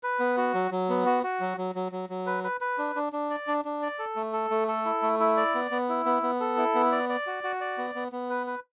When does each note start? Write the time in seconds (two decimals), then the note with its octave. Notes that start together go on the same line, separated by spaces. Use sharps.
0.03 B4
0.20 B3
0.37 F#4
0.54 F#3
0.71 F#3
0.89 B3
1.06 F#4
1.23 F#4
1.40 F#3
1.58 F#3
1.75 F#3
1.92 F#3
2.10 F#3
2.26 B4
2.44 B4
2.61 B4
2.78 D4
2.95 D4
3.13 D4
3.30 D5
3.47 D4
3.65 D4
3.82 D5
3.99 A4
4.16 A3
4.33 A4
4.50 A3
4.68 A4
4.85 E4
5.02 A3
5.20 E4
5.37 D5
5.55 B3
5.71 B3
5.89 E4
6.06 B3
6.22 B3
6.40 A4
6.57 E4
6.75 B3
6.92 D5
7.09 D5
7.27 F#4
7.44 F#4
7.61 D5
7.78 B3
7.95 B3
8.12 B3
8.30 B4
8.47 B4